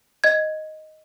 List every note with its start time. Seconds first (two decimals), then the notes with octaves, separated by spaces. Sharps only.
0.24 D#5 G#6